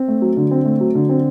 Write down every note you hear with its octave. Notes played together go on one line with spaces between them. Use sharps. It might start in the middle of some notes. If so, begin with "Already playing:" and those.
Already playing: C4
A3
F#3
D3
C4
A3
F#3
D3
C4